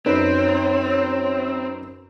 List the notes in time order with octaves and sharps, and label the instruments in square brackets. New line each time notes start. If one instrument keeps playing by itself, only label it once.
[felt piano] F#2 D#4 B4 [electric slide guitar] C4 [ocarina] C#5